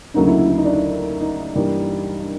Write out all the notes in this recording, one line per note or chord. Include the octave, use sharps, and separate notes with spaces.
D2 C#3 F#3 A#3 C#4 D#4
E4
E4
E4
D#4
D4
D#4
D#4
G2 E3 G3 A#3
D4